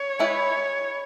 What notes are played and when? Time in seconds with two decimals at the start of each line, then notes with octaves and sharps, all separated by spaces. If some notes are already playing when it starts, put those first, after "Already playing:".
Already playing: C#5
0.19 G#3 E4 B4